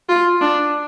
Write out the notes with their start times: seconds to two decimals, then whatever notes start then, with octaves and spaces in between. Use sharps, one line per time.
0.09 F4
0.41 D4